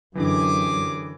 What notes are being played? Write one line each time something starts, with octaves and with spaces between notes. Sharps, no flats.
F#2 D3 E3 G4 G#4 D6